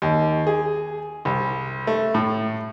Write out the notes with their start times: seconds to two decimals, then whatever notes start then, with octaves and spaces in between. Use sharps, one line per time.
0.02 D#2
0.47 G#4
1.25 C2
1.87 A3
2.14 A2